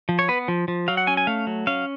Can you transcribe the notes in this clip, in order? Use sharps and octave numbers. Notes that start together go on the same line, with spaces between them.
F3
C#5
B3 B4
F3
F3
F#3 F5
F#5
C#4 G#5
G#5
A3 F5
F#3
C#4 F5